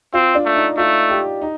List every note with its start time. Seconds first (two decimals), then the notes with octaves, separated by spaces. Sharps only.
0.14 C4 F4
0.35 D4
0.45 A3
0.55 D#4
0.77 A3 F4
1.10 G4
1.41 D#4